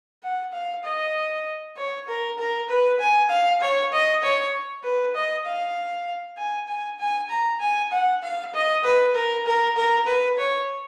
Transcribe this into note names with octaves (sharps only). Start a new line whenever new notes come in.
F#5
F5
D#5
C#5
A#4
A#4
B4
G#5
F5
C#5
D#5
C#5
B4
D#5
F5
G#5
G#5
G#5
A#5
G#5
F#5
F5
D#5
B4
A#4
A#4
A#4
B4
C#5